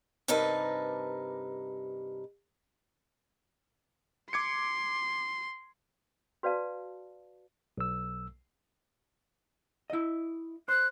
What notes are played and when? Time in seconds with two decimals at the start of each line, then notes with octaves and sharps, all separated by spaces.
0.28 G2 C3 D#4 A#4 B4 A5
4.33 C6 D6 G#6 C#7
6.43 F#4 B4 D5 F5 A5
7.78 B1 E6
9.90 E4 D#5
10.69 C5 F#6